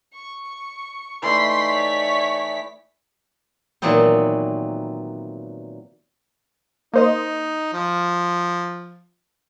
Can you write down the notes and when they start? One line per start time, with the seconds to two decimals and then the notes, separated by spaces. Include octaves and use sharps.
0.14 C#6
1.23 E3 A3 D#4 D5 C6 B6
1.70 C#5
3.82 A#2 D#3 E3 F#3 B3 C4
6.93 A#3 D#4 C5 D#5
7.73 F3